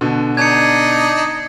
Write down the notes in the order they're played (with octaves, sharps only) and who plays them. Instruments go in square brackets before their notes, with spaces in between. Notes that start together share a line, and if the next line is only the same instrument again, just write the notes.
[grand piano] B2 D3
[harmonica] D4 D#4 [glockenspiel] G#6 C#7